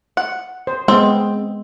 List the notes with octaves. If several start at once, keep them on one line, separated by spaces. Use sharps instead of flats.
F#5
C5
G#3 B3 C4